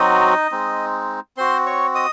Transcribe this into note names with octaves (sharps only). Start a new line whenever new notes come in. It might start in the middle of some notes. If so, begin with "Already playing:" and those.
Already playing: F#3 C4 D#4 F#4 D#5
G#3 C4 D#4
C4 F#4 C5 C6
C#5 C#6
D#5 D#6